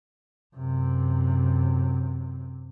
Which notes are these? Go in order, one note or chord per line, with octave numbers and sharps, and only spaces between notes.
F#2 C3